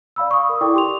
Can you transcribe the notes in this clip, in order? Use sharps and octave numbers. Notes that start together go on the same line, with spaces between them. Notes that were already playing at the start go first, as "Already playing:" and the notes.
D5 F5 B5 E6
C#6 D#6
A#4
E4 A4 D5 G5 D6
G4 C6 F7